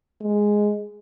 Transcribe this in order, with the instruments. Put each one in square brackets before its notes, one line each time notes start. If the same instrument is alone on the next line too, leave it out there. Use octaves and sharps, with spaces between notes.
[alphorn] G#3